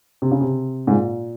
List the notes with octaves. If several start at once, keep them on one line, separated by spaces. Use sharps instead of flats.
C3
C#3
C3
G#2
A#2